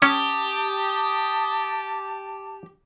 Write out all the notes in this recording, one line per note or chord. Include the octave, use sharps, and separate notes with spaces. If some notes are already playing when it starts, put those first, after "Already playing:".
C#4 G4 A5 D#6